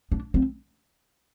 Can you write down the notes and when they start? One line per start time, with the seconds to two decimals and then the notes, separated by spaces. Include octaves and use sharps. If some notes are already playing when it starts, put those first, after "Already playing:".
0.12 D4
0.34 C4